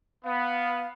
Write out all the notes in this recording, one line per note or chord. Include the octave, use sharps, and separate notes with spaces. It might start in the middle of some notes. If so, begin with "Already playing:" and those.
B3 F5